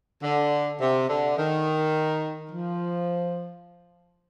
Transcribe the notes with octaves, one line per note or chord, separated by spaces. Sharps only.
D3
C3
D3
D#3
F3